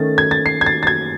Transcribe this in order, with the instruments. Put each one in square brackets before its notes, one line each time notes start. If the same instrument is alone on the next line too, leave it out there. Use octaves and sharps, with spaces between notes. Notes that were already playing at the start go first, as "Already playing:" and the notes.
Already playing: [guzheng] D#3 A3 C#4 [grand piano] A6
[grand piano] G#6
A6
C7
G#6
A6
A6
G#6